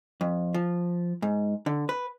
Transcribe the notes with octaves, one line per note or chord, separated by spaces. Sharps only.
F2
F3
G#2
D3
B4